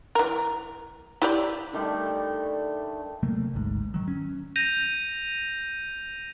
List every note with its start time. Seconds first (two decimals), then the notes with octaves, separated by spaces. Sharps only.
0.15 E3 A#4
1.22 E4 G4 D5
1.73 D3 D#3 G3 A3
3.23 C3 F#3 A3 A#3
3.54 G#1 D2 G#2
3.94 D#3 F#3
4.08 C#4
4.56 G6 A#6 D#7 F7